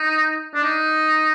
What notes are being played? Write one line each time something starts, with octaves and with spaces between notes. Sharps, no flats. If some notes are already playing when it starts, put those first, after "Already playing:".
Already playing: D#4
D4
D#4